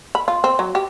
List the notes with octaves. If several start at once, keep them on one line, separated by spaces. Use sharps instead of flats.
B5
F4
C4
F#3
G4